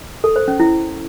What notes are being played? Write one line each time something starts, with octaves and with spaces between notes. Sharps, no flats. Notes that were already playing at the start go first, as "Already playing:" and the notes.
A4
C5
C#4
E4